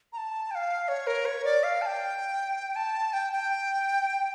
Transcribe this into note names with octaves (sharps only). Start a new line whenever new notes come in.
A#5
A5
G5
F5
C#5
A#4
C#5
D5
F5
A5
G5
A5
G5
G5